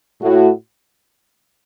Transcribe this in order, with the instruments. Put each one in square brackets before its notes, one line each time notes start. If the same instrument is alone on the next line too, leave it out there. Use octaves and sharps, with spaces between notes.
[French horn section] A2 A3 F#4